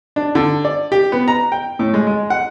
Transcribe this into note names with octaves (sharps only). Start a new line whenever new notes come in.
D4
D3
D5
G4
B3
A#5
G5
A2
G#3
G#3
F#5